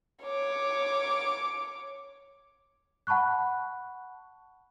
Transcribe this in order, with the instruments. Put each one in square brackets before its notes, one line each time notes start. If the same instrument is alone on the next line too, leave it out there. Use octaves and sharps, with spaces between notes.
[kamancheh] C#5 D6
[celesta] F#5 A5 B5 C#6 F#6